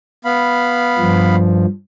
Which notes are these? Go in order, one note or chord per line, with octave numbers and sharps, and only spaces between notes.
B3 F5 B5
G2 F3